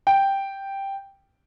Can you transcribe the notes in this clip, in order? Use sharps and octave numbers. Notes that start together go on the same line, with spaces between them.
G5